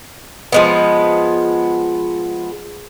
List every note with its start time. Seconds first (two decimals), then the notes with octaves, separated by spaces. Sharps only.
0.52 F3 G#3 B3